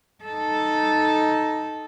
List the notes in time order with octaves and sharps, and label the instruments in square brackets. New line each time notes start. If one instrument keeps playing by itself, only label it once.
[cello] D#4 A4